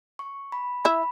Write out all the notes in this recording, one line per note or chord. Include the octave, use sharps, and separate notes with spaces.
C#6
B5
E4 E5 B5